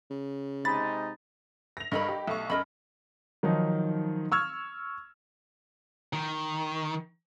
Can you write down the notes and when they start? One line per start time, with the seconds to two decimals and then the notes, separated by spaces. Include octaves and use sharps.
0.10 C#3
0.65 C3 G#3 D#4 B5 A6
1.77 A#6 F7
1.92 G2 A4 A#4 D#5 B5
2.09 G4
2.27 B1 A3 C#6
2.50 F#2 A#4 D#5 B5
3.43 D#3 F3 F#3 D#4
4.32 C#6 E6 F6 G#6
6.13 D#3